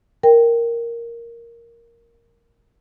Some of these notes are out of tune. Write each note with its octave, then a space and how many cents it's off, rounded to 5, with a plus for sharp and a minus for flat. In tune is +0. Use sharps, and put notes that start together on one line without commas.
A#4 +0 G5 +0